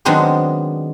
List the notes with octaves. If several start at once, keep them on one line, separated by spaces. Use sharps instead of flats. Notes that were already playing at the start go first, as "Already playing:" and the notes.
D#3 F#3 G#3 B3 C4 D4